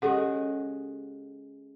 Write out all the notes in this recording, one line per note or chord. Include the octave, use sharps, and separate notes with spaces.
C#3 G#3 F#4 G4 A4 F#5